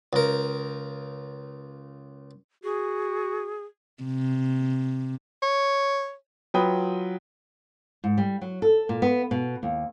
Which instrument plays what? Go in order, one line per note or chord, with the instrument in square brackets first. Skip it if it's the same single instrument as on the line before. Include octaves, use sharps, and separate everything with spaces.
[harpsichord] C#2 A#4
[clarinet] F#4 [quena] G#4
[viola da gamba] C3
[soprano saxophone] C#5
[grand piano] F#3 F4 B4 G5 D#6
[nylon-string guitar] G#2
G3
F#3
A4
A#2
B3
B2
D#2